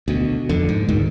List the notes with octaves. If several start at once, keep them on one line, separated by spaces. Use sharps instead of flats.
D2 B2
F2 D3
G#2
D2 G#2 D#3